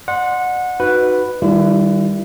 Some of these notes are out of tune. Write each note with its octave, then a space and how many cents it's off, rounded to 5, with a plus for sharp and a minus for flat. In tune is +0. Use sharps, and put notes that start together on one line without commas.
D5 +40 F#5 -20 C6 +0
D#4 +0 F#4 +0 B4 +0
D#3 +0 G3 +0 E4 +40